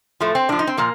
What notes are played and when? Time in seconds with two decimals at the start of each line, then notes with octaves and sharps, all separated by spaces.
0.20 A2 F3 A3
0.35 C4
0.49 A2 D4
0.52 F3
0.59 D#4
0.67 C4
0.77 A#2 F3 A#3